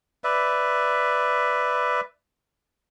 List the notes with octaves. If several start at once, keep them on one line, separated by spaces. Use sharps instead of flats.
B4 D5 E5